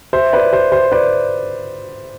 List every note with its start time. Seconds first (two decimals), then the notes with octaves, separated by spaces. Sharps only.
0.13 C5 E5
0.33 B4 D5
0.53 C5
0.72 C5
0.92 B4 D5